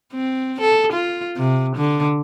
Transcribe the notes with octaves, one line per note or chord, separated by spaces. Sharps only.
C4
A4
F4
C3
D3